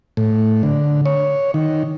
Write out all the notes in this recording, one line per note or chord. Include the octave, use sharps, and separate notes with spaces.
A2
D3
C#5
D#3